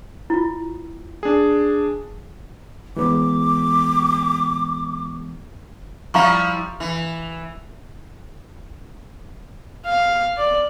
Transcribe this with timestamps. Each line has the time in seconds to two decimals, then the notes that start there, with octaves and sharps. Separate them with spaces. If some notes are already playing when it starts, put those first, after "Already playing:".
0.30 E4 F4
1.23 D4 G#4
2.96 E3 G#3 B3 D6
6.14 F3 G3 E4 F5 A#5 C#6
6.80 E3
9.86 F5
10.37 D5